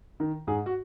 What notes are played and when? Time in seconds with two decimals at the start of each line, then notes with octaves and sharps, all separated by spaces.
0.20 D#3
0.47 G#2 G#4
0.66 F#4